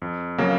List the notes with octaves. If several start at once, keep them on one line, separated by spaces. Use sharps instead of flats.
F2
C#3 F#3 A#3